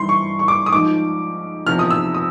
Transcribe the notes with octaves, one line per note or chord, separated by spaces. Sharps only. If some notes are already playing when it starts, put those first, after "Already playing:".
Already playing: G2 E3 G3 C6
C#6
C#6
D6
D#6
G#2 F3 D6
E2 C3 F3 F6
D#6
E6
D#6